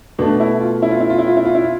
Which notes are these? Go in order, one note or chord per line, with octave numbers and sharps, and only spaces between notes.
B2 A3 D4
E4
F4
E4
F4
E4
F4
E4
F4
E4
F4
E4
F4